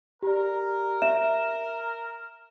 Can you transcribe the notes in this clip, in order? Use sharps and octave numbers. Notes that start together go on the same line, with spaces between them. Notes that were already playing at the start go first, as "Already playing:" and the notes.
G4 A#4 D5
E5 E7